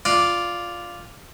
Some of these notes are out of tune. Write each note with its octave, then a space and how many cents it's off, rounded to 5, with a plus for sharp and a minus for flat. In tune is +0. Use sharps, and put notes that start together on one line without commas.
F4 +0 D5 +0